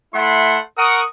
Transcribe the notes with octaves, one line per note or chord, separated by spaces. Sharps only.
A3 E4 F#5 C6
A#4 F#5 C#6 D#6